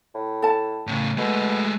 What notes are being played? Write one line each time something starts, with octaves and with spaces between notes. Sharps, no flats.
A2
A4 A5
A2 C#3
B2 G#3 A3